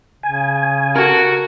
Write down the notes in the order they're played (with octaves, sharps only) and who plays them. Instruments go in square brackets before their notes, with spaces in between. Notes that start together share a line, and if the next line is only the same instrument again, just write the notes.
[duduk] C#3 [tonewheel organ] G#5
[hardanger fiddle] F#4 [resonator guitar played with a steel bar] A4 A#4